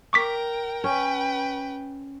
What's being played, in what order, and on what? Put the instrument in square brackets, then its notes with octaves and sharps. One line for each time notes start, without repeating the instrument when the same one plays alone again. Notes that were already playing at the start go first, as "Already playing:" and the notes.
[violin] A#4 G5 [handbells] C#6 D6 B6
[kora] C#4 [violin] B4 G5